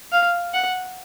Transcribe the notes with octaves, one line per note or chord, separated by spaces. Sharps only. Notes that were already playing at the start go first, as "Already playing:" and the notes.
F5
F#5